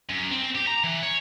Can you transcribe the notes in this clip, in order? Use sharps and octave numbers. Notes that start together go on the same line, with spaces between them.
F#2
C4
G4
A#5
E3
C#5